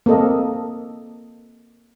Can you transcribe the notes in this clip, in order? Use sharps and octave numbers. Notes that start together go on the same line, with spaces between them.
A#3 C4 A4 D#5